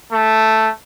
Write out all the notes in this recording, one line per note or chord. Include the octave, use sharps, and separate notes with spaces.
A3